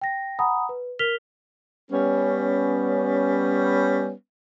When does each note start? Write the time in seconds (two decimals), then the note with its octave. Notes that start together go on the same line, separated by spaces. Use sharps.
0.01 G5 A#6
0.39 F#5 G#5 A#5 B5 D#6
0.69 B4
0.99 A#4 F6 B6 F7 G7
1.92 G3 B3 C#4